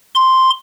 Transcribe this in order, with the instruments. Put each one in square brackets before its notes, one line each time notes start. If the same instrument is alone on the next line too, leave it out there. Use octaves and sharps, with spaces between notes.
[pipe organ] C6